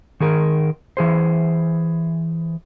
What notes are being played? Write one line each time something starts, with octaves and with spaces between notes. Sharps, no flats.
D#3 G#4 A#4
E3 G#4 C5